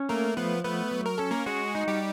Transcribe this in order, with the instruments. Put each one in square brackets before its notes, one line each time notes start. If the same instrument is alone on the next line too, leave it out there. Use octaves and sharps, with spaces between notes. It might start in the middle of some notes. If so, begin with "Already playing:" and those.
Already playing: [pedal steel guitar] C#4
[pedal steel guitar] A3 [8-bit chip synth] A#3 A#4
[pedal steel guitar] F3 [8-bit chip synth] B3 B4
[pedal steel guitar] A3 [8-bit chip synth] B3 B4
[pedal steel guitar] F#3
[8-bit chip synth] A#4
[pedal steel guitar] C#4 [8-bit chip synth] A4
[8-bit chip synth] A#3 A#4
[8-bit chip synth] G#3 G#4 [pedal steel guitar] F#4
[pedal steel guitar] D#4
[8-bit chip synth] G3 G4